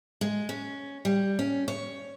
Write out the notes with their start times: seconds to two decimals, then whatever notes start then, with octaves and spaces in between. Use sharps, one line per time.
0.21 G#3
0.49 C#4
1.05 G3
1.39 C#4
1.68 C#5